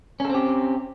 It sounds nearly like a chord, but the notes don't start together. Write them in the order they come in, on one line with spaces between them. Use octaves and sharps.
C#4 A4 C4 G4